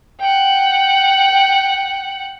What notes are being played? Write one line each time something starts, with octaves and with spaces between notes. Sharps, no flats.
F#5 G5